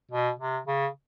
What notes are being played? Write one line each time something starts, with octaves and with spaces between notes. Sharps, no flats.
B2
C3
C#3